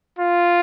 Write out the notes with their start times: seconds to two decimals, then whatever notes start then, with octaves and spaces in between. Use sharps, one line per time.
0.19 F4